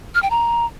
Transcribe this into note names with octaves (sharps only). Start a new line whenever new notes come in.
F6
G5
A#5